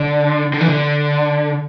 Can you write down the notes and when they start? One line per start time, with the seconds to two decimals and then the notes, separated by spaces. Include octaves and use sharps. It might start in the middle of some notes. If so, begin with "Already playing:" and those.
Already playing: D3
0.53 D3
0.61 E3
0.69 D3